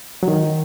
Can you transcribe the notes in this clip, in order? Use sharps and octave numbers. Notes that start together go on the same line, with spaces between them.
F#3
D#3